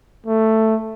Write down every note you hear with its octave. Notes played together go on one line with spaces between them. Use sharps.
A3